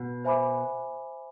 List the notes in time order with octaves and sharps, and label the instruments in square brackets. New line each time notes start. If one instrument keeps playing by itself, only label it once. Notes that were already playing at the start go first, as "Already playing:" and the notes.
Already playing: [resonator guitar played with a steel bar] B2
[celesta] C5 E5 G#5 B5 D6